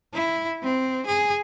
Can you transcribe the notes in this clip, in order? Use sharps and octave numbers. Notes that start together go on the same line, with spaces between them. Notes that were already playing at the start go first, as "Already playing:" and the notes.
E4
C4
G#4